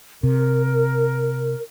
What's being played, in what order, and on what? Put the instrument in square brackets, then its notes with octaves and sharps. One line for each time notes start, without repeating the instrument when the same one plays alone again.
[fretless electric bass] C3 [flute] A#4